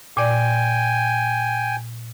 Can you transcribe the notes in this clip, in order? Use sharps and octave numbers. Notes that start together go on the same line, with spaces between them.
A#2 D5 G5 G#5